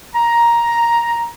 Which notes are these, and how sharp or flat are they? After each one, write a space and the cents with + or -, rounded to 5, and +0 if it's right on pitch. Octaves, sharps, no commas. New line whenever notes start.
A#5 +10